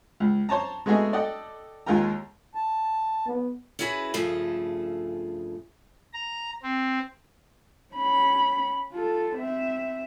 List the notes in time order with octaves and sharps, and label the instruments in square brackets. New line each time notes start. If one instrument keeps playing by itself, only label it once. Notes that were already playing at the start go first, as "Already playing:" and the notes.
[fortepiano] C#2
C5 C#5 A5 A#5
G#3 A3 B3 F#4 G#4 D#5
A4 D5 D#5 F#5 G5
D#2 G#3 F4 A#4 G5 A#5
[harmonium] A5
[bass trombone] B3
[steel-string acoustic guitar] C#4 E4 F#4 G#4 B4
G2 C#3 F3 A3 G#4 A4
[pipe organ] A#5
C4
[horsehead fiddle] C#4 B5
F4 A4
C4 E5